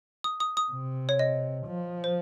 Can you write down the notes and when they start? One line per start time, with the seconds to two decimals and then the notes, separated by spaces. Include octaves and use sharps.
0.24 D#6
0.40 D#6
0.57 D#6
0.72 C3
1.09 C#5
1.19 D#5
1.67 F3
2.04 C5